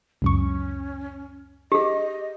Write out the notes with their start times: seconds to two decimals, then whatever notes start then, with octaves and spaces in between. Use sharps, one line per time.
0.22 C#2 F#2 C#4 C#6
1.72 G4 G#4 D#5